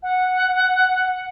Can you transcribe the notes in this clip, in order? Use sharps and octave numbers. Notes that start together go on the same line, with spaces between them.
F#5